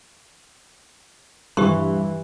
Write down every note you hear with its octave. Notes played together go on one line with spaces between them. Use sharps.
G2 E3 G4 C6